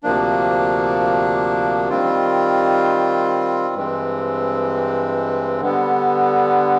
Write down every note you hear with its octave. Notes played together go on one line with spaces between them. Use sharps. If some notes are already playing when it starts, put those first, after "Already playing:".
D2 C3 F3 A#3 D4
D#3 G3 C4 F4
G2 E3 G#3 C4
D3 G3 B3